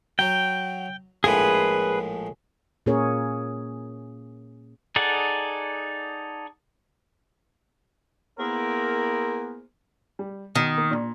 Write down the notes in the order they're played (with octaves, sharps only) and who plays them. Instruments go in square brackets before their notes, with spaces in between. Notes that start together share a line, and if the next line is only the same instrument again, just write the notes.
[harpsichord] F#3 [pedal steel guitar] G5
[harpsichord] A#1 A2 G#3 [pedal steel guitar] G#4 B4
[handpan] A#2 A#3 C#4 G#4 A#4 C#5
[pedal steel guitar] D#4 G#4 A4 D5 F#5
[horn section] A#3 B3 E4 G#4 A#4 C5
[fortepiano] G3
[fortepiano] B2 [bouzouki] D#3
[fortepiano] A#3
A#2 D4